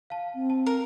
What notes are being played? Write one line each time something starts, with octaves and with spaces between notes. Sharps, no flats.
F5 A5
C4
A5
A#4